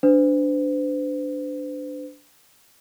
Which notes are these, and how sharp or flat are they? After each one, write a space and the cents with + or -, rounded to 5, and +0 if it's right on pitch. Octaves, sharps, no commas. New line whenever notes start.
D4 -5 C5 -45